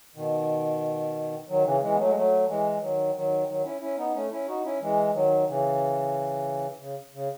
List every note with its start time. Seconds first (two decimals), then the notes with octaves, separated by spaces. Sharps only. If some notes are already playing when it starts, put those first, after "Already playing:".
0.15 B2 D#3
1.48 D#3 F#3
1.65 C#3 E3
1.82 E3 G#3
1.92 B3
1.98 F#3 A3
2.07 G#3
2.15 F#3 A3
2.48 E3 G#3
2.81 D#3 F#3
3.14 D#3 F#3
3.47 D#3 F#3
3.64 C#4 E4
3.81 C#4 E4
3.98 B3 D#4
4.14 A3 C#4
4.31 C#4 E4
4.47 D#4 F#4
4.64 C#4 E4
4.81 E3 G#3
5.14 D#3 F#3
5.47 C#3 E3
6.80 C#3
7.14 C#3